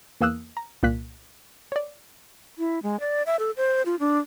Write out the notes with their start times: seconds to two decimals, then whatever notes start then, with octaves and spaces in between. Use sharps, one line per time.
0.21 E2 E3 A#3 D#6 E6 F#6
0.57 A#5
0.83 C2 A#2 A#3 F#6 B6
1.72 C#5 D5
2.58 E4
2.83 G#3
3.00 D5
3.26 E5
3.39 A4
3.57 C5
3.86 F4
4.00 D4